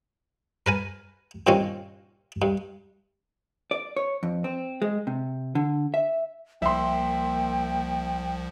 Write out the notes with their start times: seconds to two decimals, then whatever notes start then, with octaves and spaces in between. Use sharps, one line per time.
0.66 A#4 B4 G#5
1.47 G2 A#2 D#3 A#3 C4 C#4
2.42 G2
3.71 D5
3.97 C#5
4.23 F2
4.44 C4
4.82 G#3
5.07 C3
5.55 D3
5.94 E5
6.62 C2 F3 A#3 E5 G5 C6